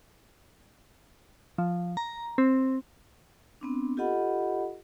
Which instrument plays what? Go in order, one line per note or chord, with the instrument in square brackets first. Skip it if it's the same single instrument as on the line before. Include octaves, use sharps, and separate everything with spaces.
[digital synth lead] F3
A#5
C4
[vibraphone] B3 C4 D4
F4 G4 A4 D#5 F#5 B5